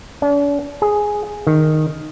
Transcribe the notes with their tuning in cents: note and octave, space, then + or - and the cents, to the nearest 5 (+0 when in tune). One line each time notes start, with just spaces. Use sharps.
D4 -45
G#4 +0
D#3 -5